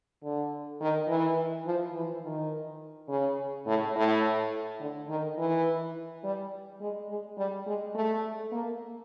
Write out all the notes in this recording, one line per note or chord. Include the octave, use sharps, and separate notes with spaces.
D3
D#3
E3
F3
E3
D#3
C#3
A2
A2
D3
D#3
E3
G3
G#3
G#3
G3
G#3
A3
A#3